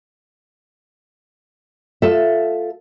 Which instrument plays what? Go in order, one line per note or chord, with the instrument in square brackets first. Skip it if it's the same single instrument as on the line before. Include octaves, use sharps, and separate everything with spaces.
[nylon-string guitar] F4 A4 E5